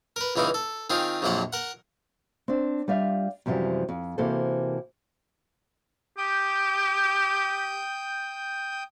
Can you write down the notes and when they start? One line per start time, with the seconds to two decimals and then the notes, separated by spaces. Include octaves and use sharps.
0.16 A#4 B4
0.36 C#2 E3 D#4 E4 F5
0.54 A4
0.90 D#3 C4 F4 G#4 C5
1.22 A#1 F2 A#2 F#3 C5 F#5
1.53 A#4 F#5
2.48 C4 D4
2.88 G3 F4 D5 E5 F5
3.46 F#2 C3 E3 F3 G3
3.89 F2
4.18 C3 E3 A#3 F#4 A4 C5
6.18 G4 G5 D#6 G6